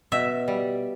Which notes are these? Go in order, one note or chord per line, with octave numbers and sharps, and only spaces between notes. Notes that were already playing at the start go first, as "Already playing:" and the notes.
B2 E5
G3